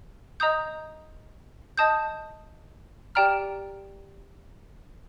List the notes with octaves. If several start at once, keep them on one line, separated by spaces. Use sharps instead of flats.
D#5 A#5 D#6 G6
D#5 A5 D#6 G6
G4 D5 G5 A#5 F6